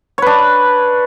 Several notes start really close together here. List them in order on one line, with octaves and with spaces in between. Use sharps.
C#5 B4 D4